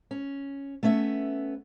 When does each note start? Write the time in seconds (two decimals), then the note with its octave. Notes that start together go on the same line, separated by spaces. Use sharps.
0.11 C#4
0.83 A3 B3 C#4 E5